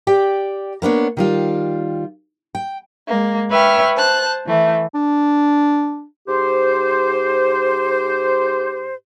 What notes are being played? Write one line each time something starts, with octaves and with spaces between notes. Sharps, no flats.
G4 D5 G5
A#3 B3 D4 C#5
D#3 G3 F4
G5
G#3 A#3
B4 C#5 E5 G5 F6
C5 A5 F#6
E3 A3
D4
G#2 G4 C5